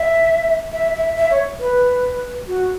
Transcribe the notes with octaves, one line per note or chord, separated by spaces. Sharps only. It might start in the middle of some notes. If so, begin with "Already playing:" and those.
Already playing: E5
E5
E5
E5
C#5
B4
F#4